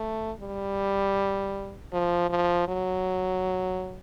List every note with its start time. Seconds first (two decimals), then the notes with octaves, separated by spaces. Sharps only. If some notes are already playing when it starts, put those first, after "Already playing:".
Already playing: A3
0.40 G3
1.93 F3
2.30 F3
2.68 F#3